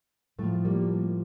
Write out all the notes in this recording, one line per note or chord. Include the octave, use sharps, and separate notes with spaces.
A2 F3 A3
G3 A#3